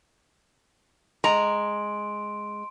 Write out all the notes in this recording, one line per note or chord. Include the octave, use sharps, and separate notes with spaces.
G#3 A#5 C6 D7